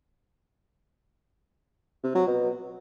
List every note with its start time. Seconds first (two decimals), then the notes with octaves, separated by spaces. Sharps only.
2.03 C3
2.15 F#3
2.27 B2